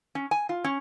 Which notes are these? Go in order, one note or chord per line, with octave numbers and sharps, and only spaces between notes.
C#4
G#5
F4
C#4